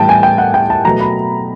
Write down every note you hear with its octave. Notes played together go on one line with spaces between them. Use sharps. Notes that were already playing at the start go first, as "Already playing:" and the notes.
Already playing: A2 E3 G3 G5 A5
G#5
G5
F#5
G5
A5
B2 F#3 A3 A#5
B5